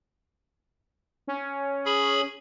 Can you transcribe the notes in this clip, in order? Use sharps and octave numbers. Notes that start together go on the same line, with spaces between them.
C#4
G#4 B5